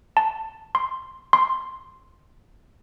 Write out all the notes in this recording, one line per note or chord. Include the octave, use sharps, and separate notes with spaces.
A5
C6
C6